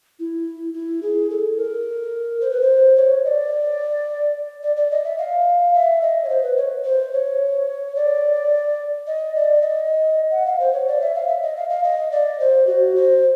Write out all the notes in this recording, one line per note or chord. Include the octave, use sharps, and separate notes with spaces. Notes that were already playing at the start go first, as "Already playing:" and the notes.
E4
E4
G#4
A4
A#4
C5
B4
C5
C#5
D#5
D5
D5
D5
D#5
E5
F5
E5
D#5
C#5
C5
B4
C#5
C5
C#5
D5
D#5
D5
D#5
F#5
F5
C5
C#5
D5
E5
F5
E5
D#5
F5
F5
D#5
D5
C5
F#4
C5